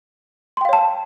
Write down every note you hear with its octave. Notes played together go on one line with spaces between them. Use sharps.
C#5 F5 G5 A5 C6